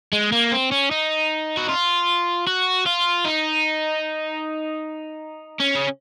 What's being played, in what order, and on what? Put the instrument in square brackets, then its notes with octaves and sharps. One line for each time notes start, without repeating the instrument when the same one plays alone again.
[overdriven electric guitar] G#3
A#3
C4
C#4
D#4
F#4
F4
F#4
F4
D#4
C#4
C#3